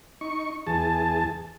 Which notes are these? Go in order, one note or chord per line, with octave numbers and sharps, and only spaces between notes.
D#4 C#6
E2 G#4 A5